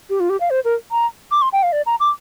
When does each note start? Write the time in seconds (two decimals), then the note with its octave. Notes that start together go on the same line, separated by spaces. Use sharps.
0.10 G4
0.20 F4
0.30 G4
0.40 F5
0.50 C5
0.65 A#4
0.92 A#5
1.31 D6
1.42 C6
1.53 G5
1.63 F5
1.72 D5
1.86 A#5
2.00 D6